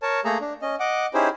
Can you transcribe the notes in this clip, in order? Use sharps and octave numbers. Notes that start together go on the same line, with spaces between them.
A#4 C#5 A5
A3 A#3 G#4 A4 A#5
D4
C#4 D#5
D#5 F#5 D6
C#4 D#4 E4 G4 G#4 C5